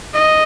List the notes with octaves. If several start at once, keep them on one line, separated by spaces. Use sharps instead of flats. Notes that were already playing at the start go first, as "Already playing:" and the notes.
D#5